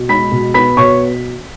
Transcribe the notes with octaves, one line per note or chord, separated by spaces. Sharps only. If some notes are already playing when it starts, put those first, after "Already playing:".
Already playing: B2
G#3 B5 B6
B2
B3 B5 B6
B2 C#5 C#6